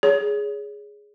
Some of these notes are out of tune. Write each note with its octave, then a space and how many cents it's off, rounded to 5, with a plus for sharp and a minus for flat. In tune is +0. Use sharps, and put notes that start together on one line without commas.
G#4 +0 C#5 +30